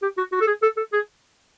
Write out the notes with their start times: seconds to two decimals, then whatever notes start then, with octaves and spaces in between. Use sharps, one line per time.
0.02 G4
0.18 F#4
0.32 F#4
0.41 A4
0.47 G#4
0.63 A4
0.77 A4
0.93 G#4